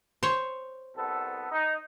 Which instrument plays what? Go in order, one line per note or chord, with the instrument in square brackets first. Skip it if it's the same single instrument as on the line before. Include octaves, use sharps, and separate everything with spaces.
[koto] C5 C#5
[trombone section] C2 B3 A4
D#4